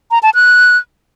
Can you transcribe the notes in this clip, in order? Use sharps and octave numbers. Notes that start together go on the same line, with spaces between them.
A#5
A5
F#6